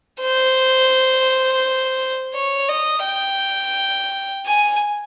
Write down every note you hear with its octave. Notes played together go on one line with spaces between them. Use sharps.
C5
C#5
D#5
G5
G#5